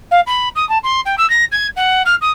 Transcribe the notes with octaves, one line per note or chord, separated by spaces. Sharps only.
F5
B5
D#6
A5
C6
G5
E6
A#6
G#6
F#5
F6
D#6